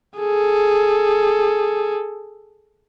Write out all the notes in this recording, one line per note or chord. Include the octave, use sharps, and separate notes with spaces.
G#4 A4